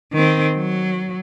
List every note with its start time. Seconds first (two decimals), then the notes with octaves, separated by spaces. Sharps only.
0.13 D#3 C4
0.56 F#3